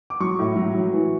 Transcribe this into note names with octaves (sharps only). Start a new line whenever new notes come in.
D6
F#3 C#6
A2
F#3
F#3
E3